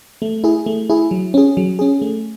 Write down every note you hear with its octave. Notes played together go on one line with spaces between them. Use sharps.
A3
E4 G#4
A3
E4 G#4
F#3
C#4 G#4
F#3
C#4 G#4
A3